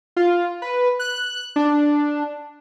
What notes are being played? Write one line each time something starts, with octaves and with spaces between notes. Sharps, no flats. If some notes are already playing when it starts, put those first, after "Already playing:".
F4
B4
F#6
D4